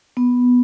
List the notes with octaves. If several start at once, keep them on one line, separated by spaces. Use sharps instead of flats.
B3